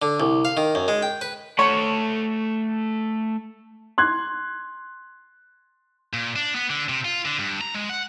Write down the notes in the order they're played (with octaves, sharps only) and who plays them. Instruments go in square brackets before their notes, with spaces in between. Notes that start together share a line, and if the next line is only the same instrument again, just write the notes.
[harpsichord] D3
C2
F5
D#3
F#2
G#3
G5
B4
[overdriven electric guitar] A3 F#5 [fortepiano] C#5
[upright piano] C6 F#6 G#6
[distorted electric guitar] A#2
D4
B3
D3
C3
F4
D3
G2
A#5
G#3
F#5